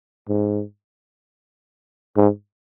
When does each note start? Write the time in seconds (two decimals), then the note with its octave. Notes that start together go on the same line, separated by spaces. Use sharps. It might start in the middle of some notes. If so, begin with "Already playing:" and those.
0.28 G#2
2.16 G#2